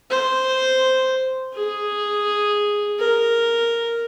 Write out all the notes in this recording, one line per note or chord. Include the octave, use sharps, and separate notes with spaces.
C5
G#4
A#4